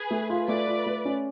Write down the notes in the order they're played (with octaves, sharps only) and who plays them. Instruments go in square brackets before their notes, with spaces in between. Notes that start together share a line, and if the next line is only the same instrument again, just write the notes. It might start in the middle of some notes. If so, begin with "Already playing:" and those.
Already playing: [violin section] G#4 B4
[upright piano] A3
F4
[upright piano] A3 [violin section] B4 D5
[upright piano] F4
A3
C#4